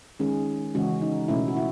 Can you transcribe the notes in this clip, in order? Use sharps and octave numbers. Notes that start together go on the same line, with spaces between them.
D#3 G#3 C#4 G#4
C#3 E3 G#3 C#4 F#4
D#4
B2 A3 C#4 E4
F#4
E4